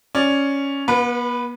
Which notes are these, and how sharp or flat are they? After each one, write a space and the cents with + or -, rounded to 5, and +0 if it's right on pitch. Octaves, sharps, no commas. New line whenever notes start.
C#4 +0 D5 +0
B3 -40 B4 +0